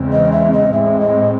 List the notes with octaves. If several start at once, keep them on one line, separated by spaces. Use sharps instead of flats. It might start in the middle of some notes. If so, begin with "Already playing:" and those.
Already playing: E2 C#3 E3 G#3 C4
D#5
E5
D#5
A2 G#3 C4 E5
D#5